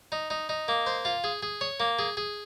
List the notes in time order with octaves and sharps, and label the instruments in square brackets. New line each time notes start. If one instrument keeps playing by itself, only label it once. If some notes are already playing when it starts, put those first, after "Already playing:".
[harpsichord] D#4
D#4
D#4
A#3
C5
F4
G#4
G#4
C#5
A#3
G#4
G#4